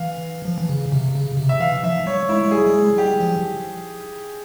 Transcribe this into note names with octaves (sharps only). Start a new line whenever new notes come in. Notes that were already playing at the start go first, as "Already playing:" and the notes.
Already playing: E3 F5
F3
E3
C#3
C3
C#3
C3
E5
E3 F5
F3 E5
G3 C#5
G#3 E4
G#3
G3 G#4
G3
G#3
G3 G4
F3